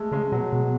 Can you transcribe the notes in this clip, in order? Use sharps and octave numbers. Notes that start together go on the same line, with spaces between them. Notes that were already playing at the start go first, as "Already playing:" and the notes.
Already playing: G#3 A3
C#3 G#3
G#3
B2 F#3
B2 G#3